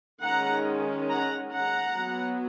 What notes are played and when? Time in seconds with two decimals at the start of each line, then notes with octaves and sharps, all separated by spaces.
0.23 D#3 G#3 C#4 F#5 A#5
1.10 F#5 A#5
1.54 F#5 A#5
1.97 F#3 B3